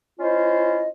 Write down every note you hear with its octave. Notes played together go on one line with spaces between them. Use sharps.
C#4 E4 F4 C5 D#5